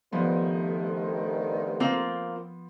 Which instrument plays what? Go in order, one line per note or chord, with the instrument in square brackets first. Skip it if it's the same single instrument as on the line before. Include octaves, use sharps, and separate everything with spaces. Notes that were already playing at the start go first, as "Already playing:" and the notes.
[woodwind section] G2 C3 D#3 [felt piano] F3 B3 [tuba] A3
[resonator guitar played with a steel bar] A#3 C4 F4